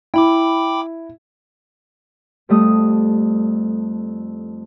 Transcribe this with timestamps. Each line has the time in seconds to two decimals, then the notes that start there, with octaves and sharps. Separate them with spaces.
0.14 E4 G5 B5 D6
2.49 F2 G3 A3 D#6